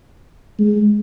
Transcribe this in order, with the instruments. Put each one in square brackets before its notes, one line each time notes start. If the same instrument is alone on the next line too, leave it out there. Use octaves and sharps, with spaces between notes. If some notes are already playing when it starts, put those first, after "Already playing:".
[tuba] G#3